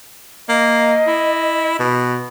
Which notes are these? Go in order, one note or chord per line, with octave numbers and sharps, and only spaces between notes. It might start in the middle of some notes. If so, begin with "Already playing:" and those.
A#3 D#5
E4
B2